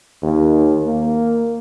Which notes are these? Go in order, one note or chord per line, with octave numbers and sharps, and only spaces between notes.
D#2
A#3